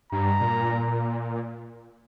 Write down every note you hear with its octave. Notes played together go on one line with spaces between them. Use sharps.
G2 A#5
A#2